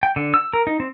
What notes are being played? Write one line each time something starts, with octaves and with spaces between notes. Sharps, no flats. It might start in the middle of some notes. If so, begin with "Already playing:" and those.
G5
D3
E6
A#4
D#4
C4